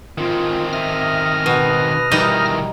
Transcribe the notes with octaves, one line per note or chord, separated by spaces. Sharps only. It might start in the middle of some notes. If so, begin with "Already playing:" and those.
D#3 C4 F4
E5 D#6 F6 A#6
B2 B4
D#3 E3 G3 D#4